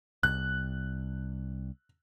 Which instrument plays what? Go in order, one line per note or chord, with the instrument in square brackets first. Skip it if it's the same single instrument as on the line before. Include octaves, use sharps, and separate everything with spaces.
[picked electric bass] C2 [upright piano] F#6